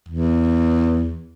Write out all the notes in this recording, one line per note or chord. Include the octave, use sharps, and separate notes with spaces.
E2